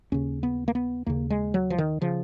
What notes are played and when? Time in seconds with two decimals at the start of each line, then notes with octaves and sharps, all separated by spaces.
0.12 D#2 C#3 C#4
0.43 B3
0.68 A#3
0.75 B3
1.07 D#2 C#3 A#3
1.30 G#3
1.54 F#3
1.70 F3
1.78 D#3
2.02 C#3 F3